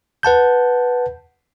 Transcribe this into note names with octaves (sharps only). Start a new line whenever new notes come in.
B4 F#5 A5 G6